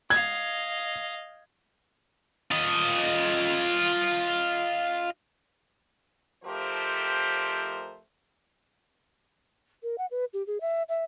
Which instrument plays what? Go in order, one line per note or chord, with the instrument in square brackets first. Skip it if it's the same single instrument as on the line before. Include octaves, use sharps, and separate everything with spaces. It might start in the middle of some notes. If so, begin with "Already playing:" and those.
[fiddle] D#5 F5 [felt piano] G#6
[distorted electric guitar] F4 D#5
[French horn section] F2 F3 A3 G4 A#4 C5
[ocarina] A#4
F#5
B4
G4
G#4
E5
E5